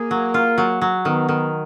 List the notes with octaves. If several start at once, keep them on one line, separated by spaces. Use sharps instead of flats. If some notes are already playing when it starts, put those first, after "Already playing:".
Already playing: A#3 G#4
F#3
F4
F#3
F#3
D#3 B3
D#3